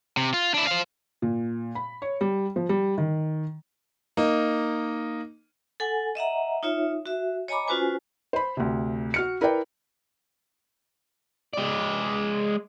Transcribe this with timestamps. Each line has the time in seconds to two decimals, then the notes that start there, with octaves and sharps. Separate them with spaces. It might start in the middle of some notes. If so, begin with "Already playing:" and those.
0.17 C3
0.34 F4
0.54 D4 E4
0.67 C5 F5
1.22 A#2
1.75 B5
2.02 C#5
2.21 G3
2.56 F3
2.69 G3
2.98 D#3
4.17 A#3 D#4
5.80 A4 F#5 G#5
6.15 D#5 E5 F#5 A#5
6.63 D#4 F4 C#5 E5
7.06 F#4 E5
7.48 C#5 D#5 G#5 A#5 B5 D6
7.68 C#4 F4 F#4 B4 C5 G#5
8.33 C5 B5
8.57 D2 C3
9.14 F#4 F6 C#7
9.41 E4 A#4 B4 D5 G5
11.53 G#3 D5